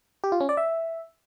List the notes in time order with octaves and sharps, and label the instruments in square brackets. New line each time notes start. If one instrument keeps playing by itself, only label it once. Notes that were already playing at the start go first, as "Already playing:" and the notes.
[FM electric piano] G4
F4
C#4
D5
E5